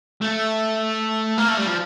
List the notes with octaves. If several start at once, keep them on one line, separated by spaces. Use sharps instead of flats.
A3
A#3
A3
G3
F3